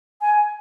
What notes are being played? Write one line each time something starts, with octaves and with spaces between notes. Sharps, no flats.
G#5